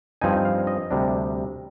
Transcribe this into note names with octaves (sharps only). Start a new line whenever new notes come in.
G2 F3 C4 D#4 G#5
F5
D#5
D2 C3 G3 D4